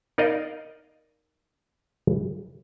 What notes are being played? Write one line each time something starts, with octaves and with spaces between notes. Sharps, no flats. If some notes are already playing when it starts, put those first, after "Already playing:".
D#4 A#4 D5 D#5 F5